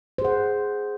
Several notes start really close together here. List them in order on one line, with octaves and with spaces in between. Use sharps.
C5 G#4 F#5